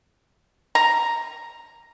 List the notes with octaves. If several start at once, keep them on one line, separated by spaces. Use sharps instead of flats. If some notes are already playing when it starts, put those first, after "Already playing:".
A#5